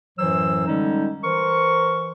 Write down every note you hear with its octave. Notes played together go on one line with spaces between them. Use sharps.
F#2 A2 E3 F#3 C5 E6
D3 G3 G#3 C#4 D#4
E3 A#4 C5 C#6